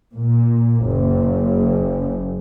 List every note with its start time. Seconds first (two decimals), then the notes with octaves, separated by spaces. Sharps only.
0.14 A#2
0.84 F#1